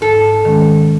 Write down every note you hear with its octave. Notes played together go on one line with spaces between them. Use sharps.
G#2 A4
D#3 G#3 C#4